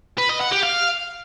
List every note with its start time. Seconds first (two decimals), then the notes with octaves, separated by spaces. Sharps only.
0.18 B4
0.29 D#5
0.40 F#5
0.51 G4
0.62 F5